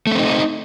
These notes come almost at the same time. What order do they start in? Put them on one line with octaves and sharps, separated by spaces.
A3 C#4 C4 D#4